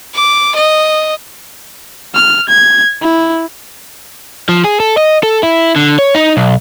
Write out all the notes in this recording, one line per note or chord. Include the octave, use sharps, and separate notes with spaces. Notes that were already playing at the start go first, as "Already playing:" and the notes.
D6
D#5
F6
G#6
E4
F3
G#4
A4
D#5
A4
E4
D3
C#5
D#4
B1